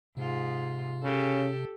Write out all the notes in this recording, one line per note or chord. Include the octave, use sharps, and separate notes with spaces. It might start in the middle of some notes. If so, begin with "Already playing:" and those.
G#2 C3 F4
C#3 C#4 G4 A4